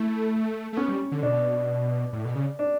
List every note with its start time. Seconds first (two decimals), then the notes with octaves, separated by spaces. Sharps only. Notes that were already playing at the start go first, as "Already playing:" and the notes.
Already playing: A3 E4
0.73 A3
0.77 B3 C#4
0.88 G3
1.12 D3
1.23 B2 D4
2.13 A2
2.25 B2
2.35 C#3
2.59 D4